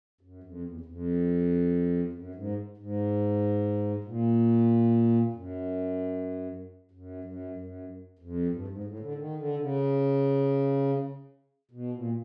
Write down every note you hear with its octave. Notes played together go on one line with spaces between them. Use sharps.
F#2
F2
E2
E2
F2
F#2
G#2
G#2
A#2
F#2
F#2
F#2
F#2
F2
G2
G#2
A2
D3
D#3
D3
C#3
B2
A#2